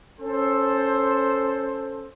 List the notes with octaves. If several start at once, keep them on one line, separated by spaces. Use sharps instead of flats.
C#4 A4 C5